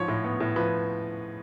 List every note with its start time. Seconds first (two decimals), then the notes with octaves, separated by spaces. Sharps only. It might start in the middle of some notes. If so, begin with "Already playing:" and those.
Already playing: G#2 F3 C#5
0.08 A2
0.24 B3
0.40 A2
0.56 F3 B4